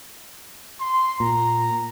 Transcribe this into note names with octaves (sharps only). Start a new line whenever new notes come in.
C6
A#2 A#5